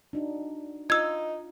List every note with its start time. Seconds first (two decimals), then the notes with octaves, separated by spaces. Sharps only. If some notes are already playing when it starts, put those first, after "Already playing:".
0.13 D4 D#4 F#4
0.90 D#4 F4 E6 G#6